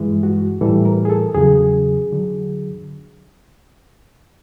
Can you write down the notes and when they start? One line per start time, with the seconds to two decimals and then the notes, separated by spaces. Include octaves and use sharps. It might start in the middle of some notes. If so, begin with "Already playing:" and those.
Already playing: G2 E3 G#3
0.23 F#4
0.61 A2 E3 G3 A4
0.85 A#4
1.05 G#4
1.10 A4
1.34 E2 C#3 F#3 G#4
2.12 D3 F#3